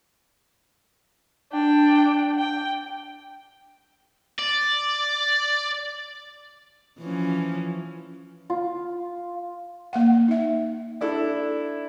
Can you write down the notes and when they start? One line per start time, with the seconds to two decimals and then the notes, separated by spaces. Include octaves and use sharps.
1.52 D4 G5
2.38 G5
4.39 D5
7.00 E3 F3 C#4
8.50 F4
9.93 A#3 F5 F#5
10.28 D#4 E5
11.01 D4 E4 A4